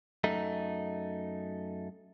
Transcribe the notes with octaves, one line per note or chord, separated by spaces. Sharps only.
F#2 A3 D#4